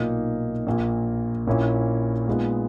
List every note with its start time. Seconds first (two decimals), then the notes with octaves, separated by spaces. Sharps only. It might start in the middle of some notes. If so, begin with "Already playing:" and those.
Already playing: B1 A#2 A#3 D#4
0.66 A#1 A#2 A#3
1.47 A#1 A#2 A#3 C#4 E4
2.28 A#2 G#3 B3 D#4